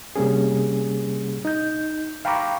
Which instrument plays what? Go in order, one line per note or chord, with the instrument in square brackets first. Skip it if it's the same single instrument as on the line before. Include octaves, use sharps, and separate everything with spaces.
[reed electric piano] C3 G3 A#3 C#4 G#4
D#4 G6
F5 G5 A#5 B5 C#6 D6